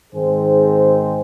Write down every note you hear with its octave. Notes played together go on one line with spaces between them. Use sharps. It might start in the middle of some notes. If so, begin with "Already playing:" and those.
G#2 D#3 C4 G#4 C5